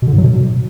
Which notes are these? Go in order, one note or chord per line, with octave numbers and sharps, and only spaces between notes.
B2
D3
G#2
F#3
B2